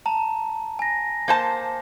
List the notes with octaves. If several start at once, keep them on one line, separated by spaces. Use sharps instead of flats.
A5 A#5
G#5 A#6
A#3 C5 A5